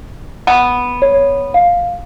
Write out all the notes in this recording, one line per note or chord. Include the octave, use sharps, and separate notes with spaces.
B3
C#5
F5